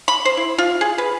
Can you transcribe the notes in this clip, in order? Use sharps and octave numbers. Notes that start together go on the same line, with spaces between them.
B5
C5
E4
F4
G#4
B4